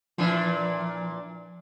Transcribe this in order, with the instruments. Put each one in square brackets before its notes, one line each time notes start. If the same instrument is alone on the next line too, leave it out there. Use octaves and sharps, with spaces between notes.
[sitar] A#2 E3 D4 [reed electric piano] F3